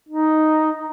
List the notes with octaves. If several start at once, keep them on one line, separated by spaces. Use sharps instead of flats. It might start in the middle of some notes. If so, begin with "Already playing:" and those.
D#4